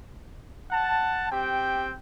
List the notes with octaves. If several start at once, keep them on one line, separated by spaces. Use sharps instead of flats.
F#5 A5
C4 G4 G5